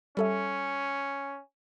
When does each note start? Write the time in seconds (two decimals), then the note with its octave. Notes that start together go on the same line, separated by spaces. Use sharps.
0.17 G3 C#4 A4 E5